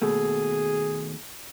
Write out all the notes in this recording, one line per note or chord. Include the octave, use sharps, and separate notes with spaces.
D#2 B2 A3 G#4